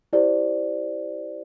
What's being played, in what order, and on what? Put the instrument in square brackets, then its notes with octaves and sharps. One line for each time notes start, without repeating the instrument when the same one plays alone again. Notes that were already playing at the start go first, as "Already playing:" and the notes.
[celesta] E4 G4 C5 D5